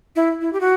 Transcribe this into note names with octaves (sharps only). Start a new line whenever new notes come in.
E4
E4
G4
F#4